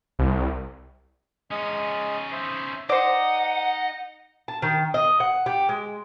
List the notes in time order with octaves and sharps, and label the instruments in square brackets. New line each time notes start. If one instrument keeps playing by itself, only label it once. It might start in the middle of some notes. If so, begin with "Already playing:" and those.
[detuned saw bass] C2
[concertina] G#3 D#6 [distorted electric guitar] C#4 D#4
[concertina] C5 E5
[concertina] D#4 A#5 [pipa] C5 D5 [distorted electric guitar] D#5 [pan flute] F#5
[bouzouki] A5
D#3
D#5
F#5
G4
G#3